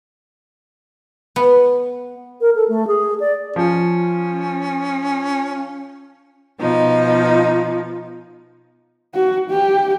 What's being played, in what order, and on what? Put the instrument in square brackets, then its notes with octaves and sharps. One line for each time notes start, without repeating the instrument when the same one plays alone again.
[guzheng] B3
[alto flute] A#4
A4
A3
G#4
D5
[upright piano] F3 [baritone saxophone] C#4
[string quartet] B2 F3 D#4
[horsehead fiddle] F#4
G4